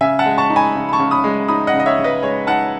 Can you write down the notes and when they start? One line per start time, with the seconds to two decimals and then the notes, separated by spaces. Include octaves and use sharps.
0.01 C#3 E5 G#5
0.19 F#5 A5
0.25 G#3
0.38 A5 C#6
0.50 D#4
0.56 G#5 B5
0.75 C#3
0.89 B5
0.93 A5 C#6
0.99 C#3
1.11 B5 D#6
1.24 G#3
1.48 D#4 B5 D#6
1.67 D#5 F#5
1.74 C#3
1.80 D#5
1.86 C#5 E5
1.99 C#3
2.04 B4 D#5
2.22 G#3 C#5
2.47 D#4 F#5 A5